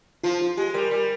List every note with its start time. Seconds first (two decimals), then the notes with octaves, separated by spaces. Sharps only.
0.23 F3 F4
0.41 F4
0.57 G#3 G4
0.74 G3 A#4
0.91 G3